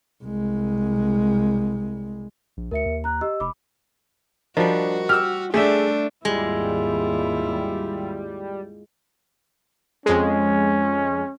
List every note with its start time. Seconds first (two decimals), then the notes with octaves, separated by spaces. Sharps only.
0.23 C2 G#3
2.57 A#1
2.71 D2 A#4 E5 C#7
2.86 D#2
3.04 A#5 F#6
3.21 G4 D#5 E6
3.40 F1 B5 D6
4.57 F3 G3 D4 F#4 A#4 D#5
5.09 G4 E6 F6
5.54 A3 D4 G4 G#4 E5
6.25 G#1 D#2 G3 G#3 E4 F4
10.06 F2 G#3 C#4